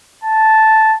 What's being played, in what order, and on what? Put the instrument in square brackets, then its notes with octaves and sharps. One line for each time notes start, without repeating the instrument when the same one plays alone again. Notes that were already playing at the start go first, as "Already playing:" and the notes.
[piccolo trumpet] A5